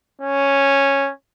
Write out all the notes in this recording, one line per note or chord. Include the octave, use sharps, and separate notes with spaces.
C#4